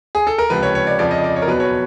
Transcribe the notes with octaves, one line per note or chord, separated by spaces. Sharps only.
G#4
A4
A#4
C#2 C3 F3 B4
C#5
C#5
D5
F2 C#3 F3 D5
D#5
D5
C#5
A#4
E2 B2 F#3 B4
C#5